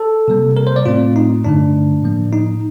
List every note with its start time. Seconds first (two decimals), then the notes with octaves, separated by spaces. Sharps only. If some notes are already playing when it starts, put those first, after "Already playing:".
Already playing: A4
0.28 C3 G3 A#3
0.57 A#4
0.67 C5
0.76 D5
0.86 A2 A3 C4 F4
1.16 D#4
1.45 G2 D3 A3 D4
2.03 A2 F3 A#3
2.33 D#4